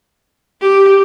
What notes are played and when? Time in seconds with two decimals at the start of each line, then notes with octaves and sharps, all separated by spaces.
0.61 G4